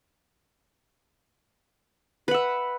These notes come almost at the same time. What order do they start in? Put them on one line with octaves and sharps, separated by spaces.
B4 F#5 E5